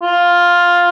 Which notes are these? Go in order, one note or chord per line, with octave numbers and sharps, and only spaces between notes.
F4